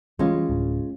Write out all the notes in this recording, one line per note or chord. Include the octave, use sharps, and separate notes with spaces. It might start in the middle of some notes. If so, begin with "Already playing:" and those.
E3 G3 G#3 C#4 F4
D1